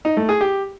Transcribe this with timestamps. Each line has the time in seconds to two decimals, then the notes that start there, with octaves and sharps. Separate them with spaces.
0.05 D#4
0.17 A3
0.29 G#4
0.41 G4